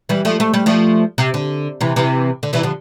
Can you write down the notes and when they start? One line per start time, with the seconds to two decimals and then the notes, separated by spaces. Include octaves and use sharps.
0.09 E3 G3
0.25 F3 A3
0.40 A3
0.54 G3
0.66 F3 A3
1.18 C3
1.34 D3
1.81 C3 E3
1.96 C3 E3
2.43 D3
2.53 C3 E3
2.63 D3 F3